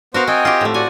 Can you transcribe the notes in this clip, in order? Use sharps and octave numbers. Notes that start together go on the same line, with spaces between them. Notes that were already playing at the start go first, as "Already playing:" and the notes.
B3 F#4 A#4 C5 F5
C4 D#5 G5 G#5
F4 G4
A2 A3
F#4 D5 F#5 G#5